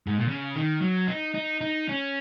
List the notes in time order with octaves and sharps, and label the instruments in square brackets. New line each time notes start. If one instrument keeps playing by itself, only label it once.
[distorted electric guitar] G#2
A#2
C#3
D#3
F#3
D#4
D#4
D#4
C#4